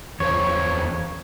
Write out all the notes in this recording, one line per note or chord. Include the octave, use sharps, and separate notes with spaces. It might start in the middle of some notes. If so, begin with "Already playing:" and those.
E2 C5 C#5 F5